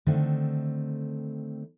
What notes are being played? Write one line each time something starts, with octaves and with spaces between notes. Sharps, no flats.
D3 D#3 A3 C4